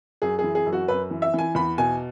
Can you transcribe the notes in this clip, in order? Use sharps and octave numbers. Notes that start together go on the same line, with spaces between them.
F#2 G#4
E3 G#4
G#4
F#2
F#4
F#2 B4
E3
E5
E3 G#5
E2 B5
B2 G#5